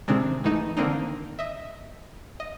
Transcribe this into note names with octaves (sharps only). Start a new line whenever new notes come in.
A2 C3 D#3 G#3 C4 D4
G#2 E3 A3 D#4
D3 D#3 A#3 C4 D4 D#4
D#5 E5
D#5